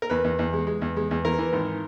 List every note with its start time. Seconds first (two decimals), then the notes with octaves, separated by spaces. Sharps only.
0.02 A#4
0.10 E2 B4
0.24 E2
0.39 E2
0.53 G#3
0.67 G#3
0.82 E2
0.97 G#3
1.11 E2
1.25 E3 A#4
1.38 E3
1.53 G#1